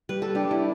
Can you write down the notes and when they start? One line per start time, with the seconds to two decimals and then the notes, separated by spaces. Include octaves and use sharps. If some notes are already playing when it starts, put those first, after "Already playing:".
0.09 G3 B4
0.22 A4
0.35 D4 G4
0.51 E4